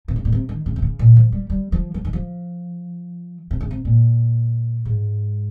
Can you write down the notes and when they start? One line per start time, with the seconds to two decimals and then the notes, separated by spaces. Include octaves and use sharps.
0.08 C3
0.16 C#3
0.25 A#2
0.32 C3
0.49 D#3
0.66 C#3
0.76 C3
0.82 C#3
0.99 A#2
1.16 F3
1.32 G3
1.50 G3
1.72 F3
1.94 F3
2.05 D#3
2.13 F3
3.51 C3
3.60 C#3
3.71 C3
3.85 A#2
4.85 G#2